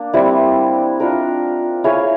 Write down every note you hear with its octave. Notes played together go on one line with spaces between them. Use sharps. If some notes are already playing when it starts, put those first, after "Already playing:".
Already playing: A#3 D4
G3 C4 E4
D4 F4 A#4 D#5
E4 G#4 C#5 F5